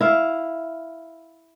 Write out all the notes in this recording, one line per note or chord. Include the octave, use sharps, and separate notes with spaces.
E4 F5